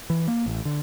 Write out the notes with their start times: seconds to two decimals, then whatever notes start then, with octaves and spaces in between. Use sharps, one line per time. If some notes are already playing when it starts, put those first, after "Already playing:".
0.10 E3
0.28 A#3
0.46 A1
0.65 D3